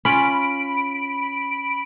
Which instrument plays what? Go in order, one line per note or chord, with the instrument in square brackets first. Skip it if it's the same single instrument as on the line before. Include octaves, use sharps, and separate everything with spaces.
[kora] C#4 F4 [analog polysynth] B5 D7